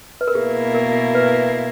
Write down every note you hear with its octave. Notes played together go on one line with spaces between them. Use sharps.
B4
A#4
B2 A#3 E4 G#4
A#4
B4